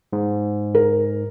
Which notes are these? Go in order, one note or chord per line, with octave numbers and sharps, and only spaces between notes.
G#2
A#4